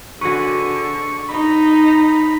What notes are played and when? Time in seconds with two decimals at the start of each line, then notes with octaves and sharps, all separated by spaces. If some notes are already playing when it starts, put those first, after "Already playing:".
0.21 D3 F#4 G#4 B4 C#6
1.29 D#4 A#5 B5